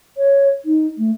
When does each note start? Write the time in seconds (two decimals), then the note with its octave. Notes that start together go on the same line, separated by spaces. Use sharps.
0.17 C#5
0.65 D#4
0.98 A3